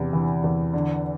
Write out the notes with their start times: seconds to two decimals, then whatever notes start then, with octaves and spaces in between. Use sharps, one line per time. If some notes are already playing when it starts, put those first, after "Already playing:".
Already playing: E2 C3
0.13 E3
0.44 E2
0.74 D3